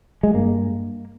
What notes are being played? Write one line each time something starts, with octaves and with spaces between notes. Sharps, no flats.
G#3
G2 A#3